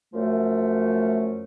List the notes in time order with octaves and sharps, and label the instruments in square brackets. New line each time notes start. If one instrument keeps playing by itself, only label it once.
[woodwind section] F#2 F3 A3